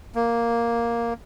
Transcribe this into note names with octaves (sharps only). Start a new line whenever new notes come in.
A#3